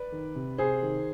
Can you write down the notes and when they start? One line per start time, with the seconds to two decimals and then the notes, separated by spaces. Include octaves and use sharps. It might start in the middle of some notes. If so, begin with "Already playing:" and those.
Already playing: B4 D5
0.12 D#3
0.36 C3
0.58 C3 G#4 C5
0.82 D#3